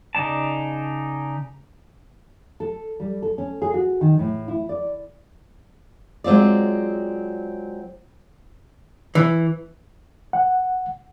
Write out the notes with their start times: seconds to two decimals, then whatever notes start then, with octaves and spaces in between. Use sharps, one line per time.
0.15 C#3 D#4 D5 A5
2.60 A4
3.00 G3
3.22 A4
3.38 C#4
3.62 G#4
3.74 F#4
4.01 D#3
4.19 A2
4.48 E4
4.69 D5
6.24 F#3 G#3 C4 F4 D5
9.15 E3
10.33 F#5